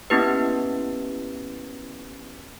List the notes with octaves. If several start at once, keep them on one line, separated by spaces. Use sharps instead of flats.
A#3 B3 C#4 E4 G4 B4